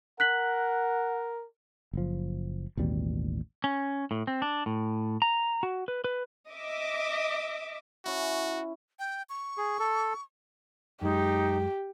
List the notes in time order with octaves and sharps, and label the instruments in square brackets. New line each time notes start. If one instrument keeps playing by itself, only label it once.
[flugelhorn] A#4 [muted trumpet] F#5 [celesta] F#6 B6 F#7
[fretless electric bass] F#1 F3
A1 D#2 B2 G3
[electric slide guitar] C#4
A2
C4
D4
A2
A#5
F#4
B4
B4
[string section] D#5 E5 D6
[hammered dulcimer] C#4 E4 [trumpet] F#4
[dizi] G5
C#6
[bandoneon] G#4
A4
[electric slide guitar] F#2 G#3 [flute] D#4 [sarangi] G4